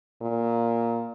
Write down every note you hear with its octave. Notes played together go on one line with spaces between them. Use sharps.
A#2